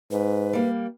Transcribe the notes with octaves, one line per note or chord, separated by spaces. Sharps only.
G#2 B4
G3 A#3